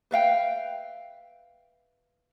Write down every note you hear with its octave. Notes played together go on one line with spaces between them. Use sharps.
B4 E5 F5 G5